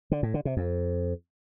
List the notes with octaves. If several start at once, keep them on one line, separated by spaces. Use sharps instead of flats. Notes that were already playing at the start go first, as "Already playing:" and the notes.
D3
A2
D3
C3
F2